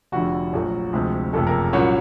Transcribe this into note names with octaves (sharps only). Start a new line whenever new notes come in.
F1 F2 D3 F#4
A#1 A#2 F#3 A3
D2 C3 F3 G#3 G#4
F#1 F2 C3 A3 A4
A#3 A#4
C2 A#2 F#3 C#4 C#5